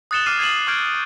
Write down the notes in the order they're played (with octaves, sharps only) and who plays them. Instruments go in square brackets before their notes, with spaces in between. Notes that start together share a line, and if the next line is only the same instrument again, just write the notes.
[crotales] D#6 F#6 A6 C#7 E7 G7
D6 F6 C7 D#7
G#6 A6 C7 D#7 E7 F#7
C7
C#6 F6 G6 G#6 D7